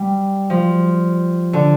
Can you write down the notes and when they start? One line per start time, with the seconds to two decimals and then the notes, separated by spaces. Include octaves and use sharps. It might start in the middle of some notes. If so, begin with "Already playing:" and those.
Already playing: G3
0.50 F3
1.53 D3